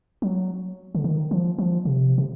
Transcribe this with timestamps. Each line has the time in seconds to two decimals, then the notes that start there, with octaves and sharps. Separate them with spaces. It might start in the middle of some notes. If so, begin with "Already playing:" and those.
0.22 F#3
0.95 D3
1.04 D#3
1.31 F3
1.58 F3
1.85 C3
2.18 C3